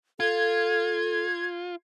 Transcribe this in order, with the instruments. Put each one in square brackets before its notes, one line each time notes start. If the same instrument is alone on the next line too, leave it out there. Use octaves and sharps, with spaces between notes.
[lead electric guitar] F4 [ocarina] A4 [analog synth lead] G#6